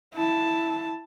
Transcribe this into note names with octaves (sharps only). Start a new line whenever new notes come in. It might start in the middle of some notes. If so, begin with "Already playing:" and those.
E4 A5